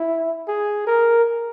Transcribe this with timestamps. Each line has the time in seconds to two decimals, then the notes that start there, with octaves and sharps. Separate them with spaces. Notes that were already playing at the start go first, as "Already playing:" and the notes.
Already playing: E4
0.48 G#4
0.87 A#4